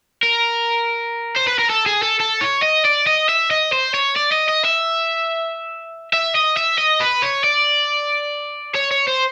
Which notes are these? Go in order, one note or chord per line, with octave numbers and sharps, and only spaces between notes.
A#4
C5
B4
A#4
A4
G#4
A4
A4
C#5
D#5
D5
D#5
E5
D#5
C5
C#5
D5
D#5
D#5
E5
E5
D#5
E5
D#5
B4
C#5
D5
C#5
C#5
C5